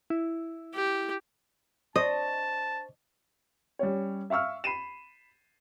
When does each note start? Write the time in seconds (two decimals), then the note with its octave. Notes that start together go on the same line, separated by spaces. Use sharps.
0.10 E4
0.74 G4
1.96 D4 C5 D#5 A5 C#6
3.79 G3 C#4 C#5
4.30 E5 F5 C#6 E6 F6
4.64 B5 C7 D#7 E7